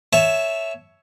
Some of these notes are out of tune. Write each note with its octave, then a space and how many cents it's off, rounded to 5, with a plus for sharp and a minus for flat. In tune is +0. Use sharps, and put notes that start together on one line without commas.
C#5 +5 E5 +0 A5 -15